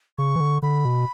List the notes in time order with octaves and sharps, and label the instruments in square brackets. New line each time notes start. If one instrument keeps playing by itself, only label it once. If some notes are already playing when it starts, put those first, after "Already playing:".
[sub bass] C#3 [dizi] C#6
[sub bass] E3
D3
[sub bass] D3 [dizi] B5
[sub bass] B2